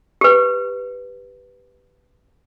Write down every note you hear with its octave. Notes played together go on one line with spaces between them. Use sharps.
G4 B4